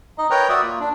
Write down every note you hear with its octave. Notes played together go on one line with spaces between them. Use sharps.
D#4 D#5
A#4 B4 C#5 G5 A#5
F#4 D5 E5 D#6
A#3 F4
D4